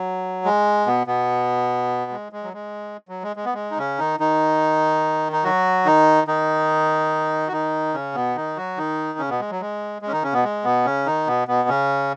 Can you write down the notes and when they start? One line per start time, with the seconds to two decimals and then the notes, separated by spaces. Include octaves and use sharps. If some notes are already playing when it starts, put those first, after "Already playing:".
Already playing: F#3
0.45 G#3
0.86 B2 B3
1.07 B2 B3
2.11 G#3
2.32 G#3
2.43 F#3
2.53 G#3
3.09 F#3
3.23 G#3
3.36 G#3
3.45 B3
3.54 G#3
3.71 D#4
3.77 C#3 C#4
3.99 D#3 D#4
4.19 D#3 D#4
5.32 D#4
5.44 F#3 F#4
5.85 D#3 D#4
6.27 D#3 D#4
7.48 F#4
7.52 D#3 D#4
7.94 C#3 C#4
8.15 B2 B3
8.36 D#3 D#4
8.57 F#3 F#4
8.77 D#3 D#4
9.19 C#3 C#4
9.29 B2 B3
9.40 G#3
9.50 F#3
9.61 G#3
10.02 G#3
10.07 C#4
10.12 D#3 D#4
10.23 C#3 C#4
10.33 B2 B3
10.44 G#3
10.64 B2 B3
10.85 C#3 C#4
11.06 D#3 D#4
11.27 B2 B3
11.48 B2 B3
11.69 C#3 C#4